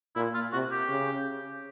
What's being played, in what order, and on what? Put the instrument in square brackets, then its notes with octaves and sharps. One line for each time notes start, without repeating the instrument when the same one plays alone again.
[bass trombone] A#2 [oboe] E4
[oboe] F4
[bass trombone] C3 [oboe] F#4
[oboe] G4
[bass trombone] C#3